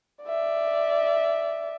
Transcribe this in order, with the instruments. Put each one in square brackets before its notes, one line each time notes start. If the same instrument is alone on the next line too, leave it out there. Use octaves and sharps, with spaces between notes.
[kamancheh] D5 E5